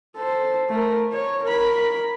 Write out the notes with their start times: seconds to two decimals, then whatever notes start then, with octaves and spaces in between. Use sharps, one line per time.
0.17 A4 C5
0.69 A3 A#4
1.12 C#5
1.44 A#4 B5